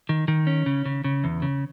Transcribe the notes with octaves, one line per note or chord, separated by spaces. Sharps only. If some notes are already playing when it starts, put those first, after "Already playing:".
D#3
D#3
C#4
C#3
C#3
C#3
E2
C#3